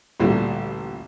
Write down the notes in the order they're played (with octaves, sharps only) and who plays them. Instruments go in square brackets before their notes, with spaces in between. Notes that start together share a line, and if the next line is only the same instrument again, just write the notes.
[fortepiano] A1 D2 A#2 G3